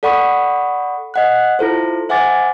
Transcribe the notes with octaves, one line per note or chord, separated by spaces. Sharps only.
A4 D5 F#5 B5 C#6 D#6
D#5 F#5 F#6
E4 F4 A4 C5
C5 E5 F#5 G#5 D6 A6